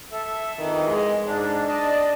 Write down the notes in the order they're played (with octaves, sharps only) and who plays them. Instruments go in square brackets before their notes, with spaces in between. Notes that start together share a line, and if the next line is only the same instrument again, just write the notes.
[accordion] A4 E5
[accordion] F2 E3 [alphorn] D#3
[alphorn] G#3
[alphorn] G#2 [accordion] D4
[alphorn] D4 [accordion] D5 D#5 A5